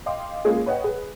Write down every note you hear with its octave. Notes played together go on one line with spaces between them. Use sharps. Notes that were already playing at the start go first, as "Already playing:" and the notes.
D#5 F5 G5 C6 D6
G#3 A#3 C#4 F4 G#4
B4 C#5 D#5 F#5 G5
G#4 B4